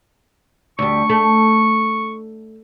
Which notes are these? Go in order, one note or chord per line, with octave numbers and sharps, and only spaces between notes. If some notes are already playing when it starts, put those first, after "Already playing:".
D2 G3 C#6
A3